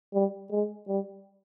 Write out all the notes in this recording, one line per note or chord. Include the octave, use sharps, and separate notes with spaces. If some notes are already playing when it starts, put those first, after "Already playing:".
G3
G#3
G3